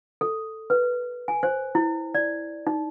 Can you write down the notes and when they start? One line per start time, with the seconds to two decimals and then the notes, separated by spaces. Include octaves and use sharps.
0.21 A4
0.70 B4
1.28 G#5
1.43 C5
1.75 E4
2.14 D5
2.67 D#4